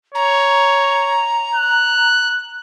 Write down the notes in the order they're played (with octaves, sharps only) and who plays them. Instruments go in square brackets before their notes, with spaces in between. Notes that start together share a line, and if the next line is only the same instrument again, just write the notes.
[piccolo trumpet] C#5 [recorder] A#5
[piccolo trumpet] F#6